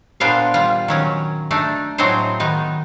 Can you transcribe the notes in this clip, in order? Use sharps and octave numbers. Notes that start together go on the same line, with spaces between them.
A#2 B3 D4 C5 F5
G3 F4
D#3 F#3 C#4
A3 D4 D#4
A2 F#3 G#3 C4 D#4 C5
D#3 B3 D#4